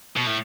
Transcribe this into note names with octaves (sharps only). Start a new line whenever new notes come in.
B2
A2